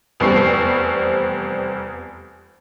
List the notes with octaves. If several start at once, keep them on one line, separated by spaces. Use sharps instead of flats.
F1 E2 G3 C4 C#6 C7